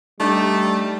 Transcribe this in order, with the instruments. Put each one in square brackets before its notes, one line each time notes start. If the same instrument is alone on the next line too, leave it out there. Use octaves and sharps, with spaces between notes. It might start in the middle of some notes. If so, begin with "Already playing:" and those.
[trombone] G3 [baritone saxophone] A3 [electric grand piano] D4 D#4 G4